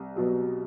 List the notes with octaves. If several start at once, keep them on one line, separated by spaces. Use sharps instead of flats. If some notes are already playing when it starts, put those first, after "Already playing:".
Already playing: C2
B2 F#3